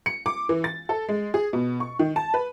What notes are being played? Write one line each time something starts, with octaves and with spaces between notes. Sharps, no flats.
C#7
D6
E3
A6
A4
G#3
G#4
B2
C#6
D#3
A5
B4